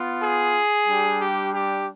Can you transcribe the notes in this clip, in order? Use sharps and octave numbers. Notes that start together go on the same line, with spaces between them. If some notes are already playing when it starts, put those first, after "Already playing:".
Already playing: B3 F4
G#4
G3 D4 G4
G4
G4